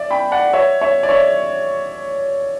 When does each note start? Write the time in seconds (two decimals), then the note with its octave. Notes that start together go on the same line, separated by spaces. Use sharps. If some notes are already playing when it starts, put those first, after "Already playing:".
Already playing: D5 E5
0.11 G5 B5
0.32 D5 F#5
0.53 C#5 E5
0.81 C#5 E5
1.03 D5
1.09 C#5 E5